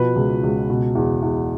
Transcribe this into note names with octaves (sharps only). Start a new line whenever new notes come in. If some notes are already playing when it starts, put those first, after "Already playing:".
Already playing: B2 F3 B4
C#2
C#2
B2
E2
E2